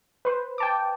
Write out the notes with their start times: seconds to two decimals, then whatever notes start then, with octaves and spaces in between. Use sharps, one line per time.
0.25 B4 C5
0.58 G5 A5 D6